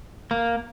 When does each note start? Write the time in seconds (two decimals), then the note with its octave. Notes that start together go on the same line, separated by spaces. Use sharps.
0.31 A#3